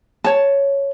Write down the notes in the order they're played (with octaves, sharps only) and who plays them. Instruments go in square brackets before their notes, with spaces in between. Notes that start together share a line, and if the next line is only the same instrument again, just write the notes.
[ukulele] C#5 A5